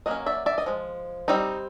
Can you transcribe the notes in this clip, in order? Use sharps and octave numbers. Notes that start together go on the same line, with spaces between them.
F#3 A#3 C#4 D#5
D5 E5
D5 E5
D#5
F3 G#3
G3 C4 D#4